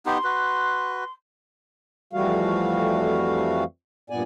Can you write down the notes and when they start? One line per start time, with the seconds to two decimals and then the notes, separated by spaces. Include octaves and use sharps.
0.06 B3 D#4 G4 C6
0.24 F#4 B4
2.13 F2 E3 G3 A3 F#4 F5
4.10 G2 A#2 B3 D5 G#5